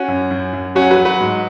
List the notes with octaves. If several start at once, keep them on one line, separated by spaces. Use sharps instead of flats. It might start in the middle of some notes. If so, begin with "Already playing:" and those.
Already playing: C#4 F#4
F#2
F#2
F#2
F#3 C#4 F#4
F#4 B4
F#3
F#4 B4
G#2